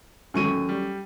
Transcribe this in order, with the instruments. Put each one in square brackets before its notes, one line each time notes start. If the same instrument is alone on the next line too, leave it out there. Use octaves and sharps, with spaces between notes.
[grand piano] D#2 C#6 D#7 [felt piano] F#3 A3 C#4
[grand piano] G3